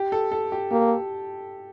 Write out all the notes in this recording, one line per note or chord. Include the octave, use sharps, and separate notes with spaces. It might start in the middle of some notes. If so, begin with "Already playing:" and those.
Already playing: G4
A4
A4
G4
A#3 G4